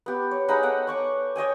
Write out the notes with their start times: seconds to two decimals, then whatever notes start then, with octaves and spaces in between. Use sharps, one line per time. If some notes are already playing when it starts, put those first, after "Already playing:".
0.06 B3 G4
0.31 C#5
0.48 D#4 G#4 F#5 B5
0.63 A4 F#5 G5
0.87 C#5 C#6 D6
1.36 C#5 D#5 G5 G#5